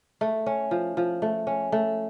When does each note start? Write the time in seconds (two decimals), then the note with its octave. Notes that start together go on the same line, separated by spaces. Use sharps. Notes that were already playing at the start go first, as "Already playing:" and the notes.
0.21 A3
0.46 C#4
0.71 F3
0.97 F3
1.22 A3
1.47 C#4
1.72 A3